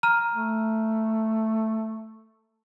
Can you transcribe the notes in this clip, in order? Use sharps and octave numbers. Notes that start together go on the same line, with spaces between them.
A#5 F6 D#7
A3